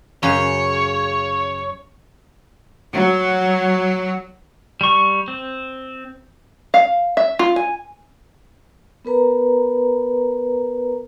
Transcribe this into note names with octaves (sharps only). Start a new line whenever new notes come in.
F#2 C#3 G#4 C#5
F#3
G3 C#6
C4
F5
E5
F4
G#5
B3 A#4 B4 A#5